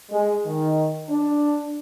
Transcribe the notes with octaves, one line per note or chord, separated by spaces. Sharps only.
G#3
D#3
D4